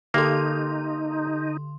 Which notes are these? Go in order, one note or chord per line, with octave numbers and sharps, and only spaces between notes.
D3 A#3 D#4 G4 A4 C6